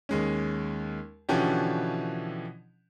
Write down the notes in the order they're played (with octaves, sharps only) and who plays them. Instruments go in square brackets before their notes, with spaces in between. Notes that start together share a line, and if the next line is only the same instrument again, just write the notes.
[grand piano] D#2 G#3 C#4
B2 D3 E3 F3 C#4 G4